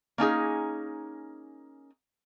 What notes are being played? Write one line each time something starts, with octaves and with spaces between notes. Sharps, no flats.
A#3 C#4 D#4 G#4